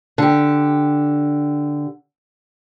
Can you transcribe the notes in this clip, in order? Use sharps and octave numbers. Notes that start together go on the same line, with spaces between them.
D3 G4